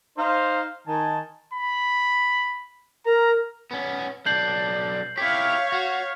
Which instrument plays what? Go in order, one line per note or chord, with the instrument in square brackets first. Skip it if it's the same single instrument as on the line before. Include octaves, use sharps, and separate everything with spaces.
[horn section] D#4 C5 F5
D#3 G#5 A5
[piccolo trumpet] B5
[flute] A#4 [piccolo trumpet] A#5
[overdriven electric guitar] B3 C#4
[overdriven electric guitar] B1 D4 [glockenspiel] G6 C7 F#7
[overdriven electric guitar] E4 G4 [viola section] C#5 F5 [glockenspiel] B6
[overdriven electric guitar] F#4